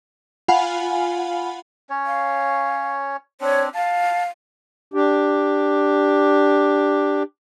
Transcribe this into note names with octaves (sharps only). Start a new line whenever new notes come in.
F4 F5 F#5 G#5 B5
C#4 C#5
F5
C4 D4 C#5
F5 A5
D4 G4